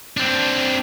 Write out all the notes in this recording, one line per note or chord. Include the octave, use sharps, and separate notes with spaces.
C4 D4